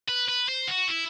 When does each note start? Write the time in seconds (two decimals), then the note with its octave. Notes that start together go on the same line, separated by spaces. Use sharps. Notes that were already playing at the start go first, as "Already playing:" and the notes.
0.09 B4
0.29 B4
0.49 C5
0.68 F#4
0.88 E4